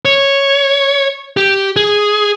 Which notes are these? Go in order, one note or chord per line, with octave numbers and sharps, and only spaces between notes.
C#5
G4
G#4